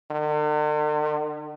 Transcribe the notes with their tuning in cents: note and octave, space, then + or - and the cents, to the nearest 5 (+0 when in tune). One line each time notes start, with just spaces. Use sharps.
D3 +45